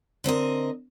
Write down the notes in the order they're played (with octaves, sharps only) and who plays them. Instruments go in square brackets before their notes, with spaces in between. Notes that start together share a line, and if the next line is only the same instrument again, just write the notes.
[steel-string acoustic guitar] D3 C4 A#4 D#5